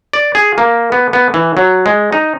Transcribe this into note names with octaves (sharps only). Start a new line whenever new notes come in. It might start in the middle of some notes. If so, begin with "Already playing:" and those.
D5
G#4
A#3
B3
B3
E3
F#3
G#3
D#4